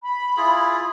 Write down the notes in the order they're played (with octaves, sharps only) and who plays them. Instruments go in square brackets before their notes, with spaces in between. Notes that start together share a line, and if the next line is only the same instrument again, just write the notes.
[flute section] B5
[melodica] E4 F4 G#4